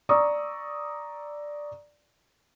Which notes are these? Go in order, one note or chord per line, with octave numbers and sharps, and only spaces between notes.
D5 A#5 C#6 D#6 E6